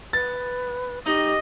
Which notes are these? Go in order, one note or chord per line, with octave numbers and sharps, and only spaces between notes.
B4 A6
D#4 G4 D#5